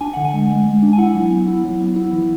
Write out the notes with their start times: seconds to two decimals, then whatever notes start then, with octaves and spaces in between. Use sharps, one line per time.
0.01 D4 G#5
0.13 D3 F#5
0.25 G#5
0.33 G#3
0.49 G#3
0.66 G#3
0.82 D4
0.93 G#5
0.98 E4 F#5
1.14 F#3
1.31 B3
1.48 E4
1.64 F#3
1.80 B3
1.96 E4
2.12 E3